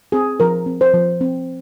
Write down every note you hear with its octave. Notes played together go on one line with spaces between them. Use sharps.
C4 G#4
F3 A#4
C4
C5
F3
C4